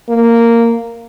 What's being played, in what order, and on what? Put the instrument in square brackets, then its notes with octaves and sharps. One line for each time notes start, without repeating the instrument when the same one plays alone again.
[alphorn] A#3